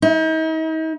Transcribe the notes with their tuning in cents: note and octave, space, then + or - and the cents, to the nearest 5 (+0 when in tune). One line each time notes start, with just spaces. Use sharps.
D#4 +40